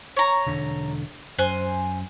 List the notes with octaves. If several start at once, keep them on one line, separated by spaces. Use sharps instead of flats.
C#5 A#5
E1 D3
F#2 C5 G#5 F#6